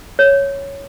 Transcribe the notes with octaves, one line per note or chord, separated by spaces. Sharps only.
C#5